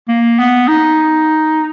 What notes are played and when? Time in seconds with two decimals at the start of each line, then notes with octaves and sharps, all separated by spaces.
0.09 A#3
0.39 B3
0.68 D#4